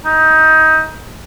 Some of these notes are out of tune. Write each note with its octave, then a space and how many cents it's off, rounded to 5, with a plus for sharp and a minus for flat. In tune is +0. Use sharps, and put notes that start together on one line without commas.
D#4 +20